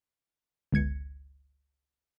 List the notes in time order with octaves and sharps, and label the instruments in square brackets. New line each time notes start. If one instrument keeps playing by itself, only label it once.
[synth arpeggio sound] G1 C#2 G#6 C#7